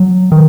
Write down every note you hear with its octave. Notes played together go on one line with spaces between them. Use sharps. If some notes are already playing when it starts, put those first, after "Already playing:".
Already playing: F#3
D#3